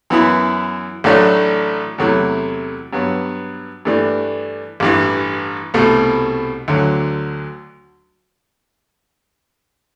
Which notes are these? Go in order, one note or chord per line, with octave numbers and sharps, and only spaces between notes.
F#2 E3 B3 E4
A1 A2 F#3 A3 D4
E2 C3 F#3 A3 E4
G2 F#3 B3
G2 E3 A3 D4
A1 G2 E3
C2 B2 A3
D2 D3 F#3